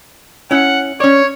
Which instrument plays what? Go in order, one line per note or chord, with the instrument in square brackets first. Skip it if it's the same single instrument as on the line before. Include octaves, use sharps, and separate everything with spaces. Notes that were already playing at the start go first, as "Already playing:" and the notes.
[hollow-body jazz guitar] C#4 E4 [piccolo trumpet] F#5
[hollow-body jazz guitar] C#4 D5 [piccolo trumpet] C#5